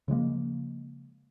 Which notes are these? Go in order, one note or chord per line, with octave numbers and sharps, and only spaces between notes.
C#3 F3 G#3 A#3